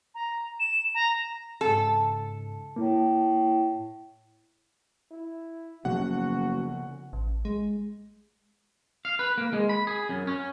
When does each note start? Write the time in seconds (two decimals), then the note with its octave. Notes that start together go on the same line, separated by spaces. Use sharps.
0.14 A#5
0.59 E7
0.94 A#5
1.61 G#2 C#3 A4
2.76 A2 A#3 E4
5.11 E4
5.85 F#1 C#3 F3 B3 F#4 F#5
7.13 A1
7.45 G#3
9.05 F5
9.19 B4
9.38 A#3
9.53 G#3
9.69 B5
9.87 G#4
10.09 F#2
10.27 C#4